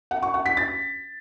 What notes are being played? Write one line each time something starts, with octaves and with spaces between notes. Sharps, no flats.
F#5
C#6
F#5
B6
A6